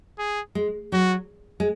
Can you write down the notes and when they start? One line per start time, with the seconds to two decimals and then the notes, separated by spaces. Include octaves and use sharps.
0.18 G#4
0.55 G#3
0.92 F#3 F#4
1.60 G#3